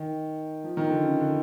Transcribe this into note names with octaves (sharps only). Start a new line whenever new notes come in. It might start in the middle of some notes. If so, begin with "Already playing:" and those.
Already playing: D#3
F3
D#3
D3
C#3
D3